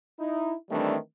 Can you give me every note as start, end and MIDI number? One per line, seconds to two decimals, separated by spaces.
0.20 0.54 63
0.20 0.54 64
0.70 0.96 51
0.70 0.96 52
0.70 0.96 55
0.70 0.96 57
0.70 0.96 60
0.70 0.96 62